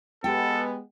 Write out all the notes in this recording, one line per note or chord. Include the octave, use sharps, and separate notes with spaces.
G#3 B3 G4 A4 G5